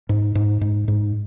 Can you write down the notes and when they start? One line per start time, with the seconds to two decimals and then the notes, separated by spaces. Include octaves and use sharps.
0.09 G#2
0.35 G#2
0.61 G#2
0.88 G#2